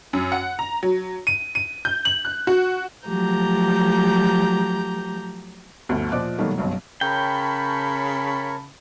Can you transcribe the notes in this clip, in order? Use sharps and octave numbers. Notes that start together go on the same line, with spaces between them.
F#2
F#5
A#5
F#3
D#7
D#7
G6
F#7
F#6
F#4
F3 F#3 A3 G4 A#5 G6
G1 D2
A#2 F3 D5 D#5 D6 F#6
B2 D#3 F#3 G3 A3 A#3
F#1 B1 G2 F#3
C#3 A#4 C#5 G5 A5 B5 C#6